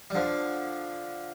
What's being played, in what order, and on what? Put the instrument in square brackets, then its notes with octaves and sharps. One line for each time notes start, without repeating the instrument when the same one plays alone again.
[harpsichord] G3
D3 F3